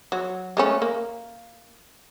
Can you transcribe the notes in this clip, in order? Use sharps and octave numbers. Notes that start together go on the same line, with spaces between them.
F#3
G#3 A3 C#4
A#3